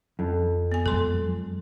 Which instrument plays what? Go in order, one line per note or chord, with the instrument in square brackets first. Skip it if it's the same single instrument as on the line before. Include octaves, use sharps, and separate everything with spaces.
[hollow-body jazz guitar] F2
[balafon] B3 G#5
[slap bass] F#2 F3 G#3 [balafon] A4 C6